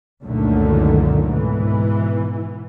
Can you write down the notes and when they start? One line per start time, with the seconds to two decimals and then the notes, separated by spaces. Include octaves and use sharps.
0.24 C#2 F#2 A#2 D3 D#3 A3
1.27 G#2 B2 E3